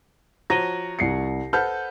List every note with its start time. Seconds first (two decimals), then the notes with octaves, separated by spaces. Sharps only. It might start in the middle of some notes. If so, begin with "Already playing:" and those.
0.50 F3 F#4 C#5 A#5 A#6 D#7 G7
0.99 C2 C7 C#7
1.53 A4 B4 C5 F#5 F6 G6